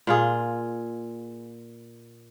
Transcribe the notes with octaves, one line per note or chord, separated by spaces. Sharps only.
A#2 F4 G#4